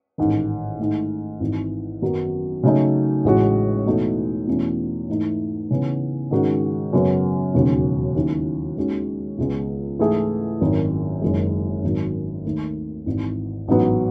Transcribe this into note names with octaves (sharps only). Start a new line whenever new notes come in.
A1 G#2 D#3
G#2 D#3 A3
G#1 G#2 E3
F#2 D#3 F#3 B3 D#4
C#3 F#3 A3 D#4
A1 A2 G#3 C#4 F#4
E2 B2 A3 D#4 A4
E2 B2 A3 C#4
G#2 E3 A3 D#4
C#3 E3 B3
G#2 D#3 G#3 C#4 F#4
F#2 C#3 F#3 B3
E1 D#2 C#3 F#3 C#4
D#2 D#3 F#3 C#4 E4
D#2 D#3 G#3 C#4 F#4
C#2 C#3 G#3 B3
G#2 E3 A3 E4 G#4
G#1 F#2 D#3
F#1 F#2 D#3 G#3
G#1 F#2 D#3 F#3
D#2 D#3 A3
G#1 G#2 E3
A1 G#2 F#3 B3